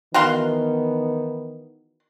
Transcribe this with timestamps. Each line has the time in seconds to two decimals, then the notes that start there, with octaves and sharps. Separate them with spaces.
0.14 D#3 E3 B3 F#4 F5 C6